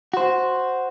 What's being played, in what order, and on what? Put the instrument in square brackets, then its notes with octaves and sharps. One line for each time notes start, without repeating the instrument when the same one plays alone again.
[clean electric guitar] F#4 C5